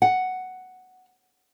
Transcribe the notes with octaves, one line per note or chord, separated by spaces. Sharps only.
F#5